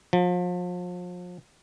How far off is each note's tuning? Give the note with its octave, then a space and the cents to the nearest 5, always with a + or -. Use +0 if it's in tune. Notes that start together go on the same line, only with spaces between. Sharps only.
F3 +35